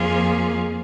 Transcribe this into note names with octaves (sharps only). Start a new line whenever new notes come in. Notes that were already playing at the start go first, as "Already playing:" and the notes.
Already playing: F2 F3 A#3 F4 G#4